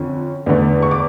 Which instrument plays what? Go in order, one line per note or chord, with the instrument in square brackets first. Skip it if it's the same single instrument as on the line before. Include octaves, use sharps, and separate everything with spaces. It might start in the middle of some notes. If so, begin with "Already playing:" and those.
Already playing: [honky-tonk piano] F2 D3 C#4
E2 D3 A3
C#6
D6